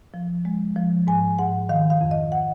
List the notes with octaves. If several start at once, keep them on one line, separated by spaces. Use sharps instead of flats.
F3
G#3
F3
G#2 G#5
G#2 F#5
D#3 F5
F5
F2
D#5
F#5